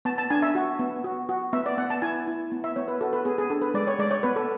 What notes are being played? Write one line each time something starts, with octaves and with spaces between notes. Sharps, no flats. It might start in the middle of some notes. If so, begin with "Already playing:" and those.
B3 A5
A5
D4 G#5
E5
F#4
B3
F#4
F#4
B3 E5
D5
B3 F#5
A5
E4 G#5
E4
B3
E5
B3 C#5
B4
F#4 A4
B4
B3 G#4
G#4
D4 A4
B4
G#3 D5
C#5
G#3 D5
C#5
B3 B4
A4